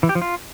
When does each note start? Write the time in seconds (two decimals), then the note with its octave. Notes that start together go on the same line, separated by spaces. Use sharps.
0.03 E3
0.09 G4
0.15 F3
0.21 F4